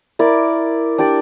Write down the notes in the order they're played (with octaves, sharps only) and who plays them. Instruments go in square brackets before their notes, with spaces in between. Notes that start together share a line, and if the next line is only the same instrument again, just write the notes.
[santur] E4 A#4 D5
D4 G4 D5